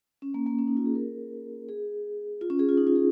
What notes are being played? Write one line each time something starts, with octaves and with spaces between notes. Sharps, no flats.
C#4
A#3
A#3
C#4
D#4
F4
G#4
A#4
G#4
F4
C#4
G#4
F4
D#4
F4
G#4